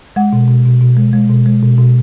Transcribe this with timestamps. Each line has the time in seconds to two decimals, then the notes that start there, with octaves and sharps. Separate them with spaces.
0.16 G#3 F#5
0.33 B2
0.48 B2
0.65 B2
0.81 B2
0.97 G#3
1.13 G#3
1.30 B2
1.46 G#3
1.63 B2
1.78 B2